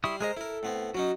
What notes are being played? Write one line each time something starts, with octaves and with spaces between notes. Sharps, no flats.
G3 E4 C6 C#6 D#6
G#3 G#4 A#4 C5 D#5 A#5
E4 A4 A#4
A2 B3 C4
F#3 C#4 D#4 F#4